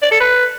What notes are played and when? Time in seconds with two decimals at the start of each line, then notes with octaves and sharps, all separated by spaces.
0.02 D5
0.11 A4
0.20 B4